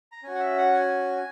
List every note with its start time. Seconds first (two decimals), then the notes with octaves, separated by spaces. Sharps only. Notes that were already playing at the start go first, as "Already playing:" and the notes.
0.12 A#5
0.23 C#4 F#4 G#5
0.35 F#5
0.40 E5
0.58 F#5
0.73 G#5